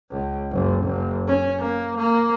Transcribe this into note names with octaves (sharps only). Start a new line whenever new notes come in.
C#2
F#1
F#1
C#4
A#3
A#3